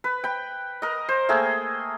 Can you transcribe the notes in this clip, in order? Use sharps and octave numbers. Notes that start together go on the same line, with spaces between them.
B4
G5 B5
A#4 D#5
C5
A3 A#3 G#4 G5